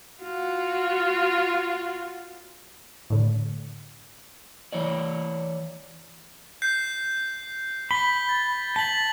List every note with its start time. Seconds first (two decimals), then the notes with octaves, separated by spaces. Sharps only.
0.22 F4 F#4
3.10 A2 D3
4.72 E3 C#5 D5
6.62 G6 C7
7.91 B5 B6 G7
8.29 A6
8.76 A5 B6 F#7